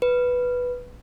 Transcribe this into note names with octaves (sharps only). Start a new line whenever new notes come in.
B4